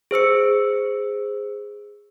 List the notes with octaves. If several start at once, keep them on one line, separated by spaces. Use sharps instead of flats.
G#4 C5 E6 C#7